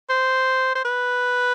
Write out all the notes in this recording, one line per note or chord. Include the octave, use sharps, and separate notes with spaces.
C5
C5
B4